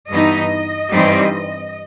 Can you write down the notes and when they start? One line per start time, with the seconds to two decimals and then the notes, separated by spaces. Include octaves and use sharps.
0.09 G2 E3 B3 D#4 D#5
0.90 G2 E3 G3 C4 D#4